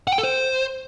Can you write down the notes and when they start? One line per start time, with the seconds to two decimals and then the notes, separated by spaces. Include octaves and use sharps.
0.07 F#5
0.13 G5
0.18 A4
0.23 C5